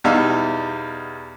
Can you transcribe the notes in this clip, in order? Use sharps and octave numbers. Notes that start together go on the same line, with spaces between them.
E2 B2 G3 D#4 E5 F5